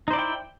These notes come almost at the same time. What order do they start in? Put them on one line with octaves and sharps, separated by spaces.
D#4 C5 D5 E4 G5